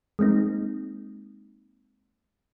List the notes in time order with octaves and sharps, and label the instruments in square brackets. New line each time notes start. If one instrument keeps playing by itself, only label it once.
[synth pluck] G#3 A#3 C4 D#4